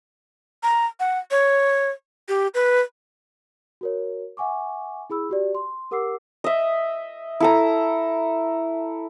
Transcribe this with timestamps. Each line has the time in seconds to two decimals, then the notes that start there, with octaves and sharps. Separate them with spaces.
0.63 A#5
1.00 F#5
1.31 C#5
2.29 G4
2.54 B4
3.81 F#4 A#4 C#5
4.37 E5 F#5 G#5 C#6 D6
5.10 E4 G#4 B5 E6
5.29 F#4 G4 D5
5.55 C6
5.91 G4 A#4 F#5 D6 E6 C7
6.44 D#5 E5
7.40 E4 A4 A#5